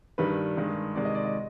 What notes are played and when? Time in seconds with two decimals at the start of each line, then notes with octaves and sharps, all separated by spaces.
0.18 G2 D#3 G3 B4
0.57 G2 D#3 G#3
0.95 C3 D#3 G#3 D5
1.05 D#5
1.15 D5
1.24 D#5